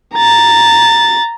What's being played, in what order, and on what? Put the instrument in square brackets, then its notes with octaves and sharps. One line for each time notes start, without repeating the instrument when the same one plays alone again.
[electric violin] A#5 A6